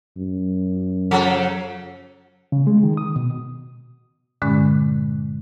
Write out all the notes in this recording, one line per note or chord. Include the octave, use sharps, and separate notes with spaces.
F#2
C#3 F3 A4
C#3
G#3
D#3
D#6
B2
G2 A#2 D3 G#3 C#4